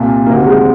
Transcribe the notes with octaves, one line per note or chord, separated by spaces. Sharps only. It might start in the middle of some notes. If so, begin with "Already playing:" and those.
Already playing: C2 A#2
D2 C3 D#3 A#3
G#3